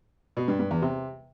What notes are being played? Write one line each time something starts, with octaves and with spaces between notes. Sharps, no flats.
B2
G2
G2
E2
C3